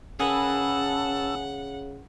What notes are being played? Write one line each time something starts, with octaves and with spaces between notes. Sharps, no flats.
C#3 C#4 G#4 A#4 B4 F#5 A5 E6